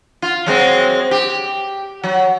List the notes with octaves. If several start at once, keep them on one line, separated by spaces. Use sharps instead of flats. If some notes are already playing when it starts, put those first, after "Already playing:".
F4
F#3 G#3 C4
G4
F#3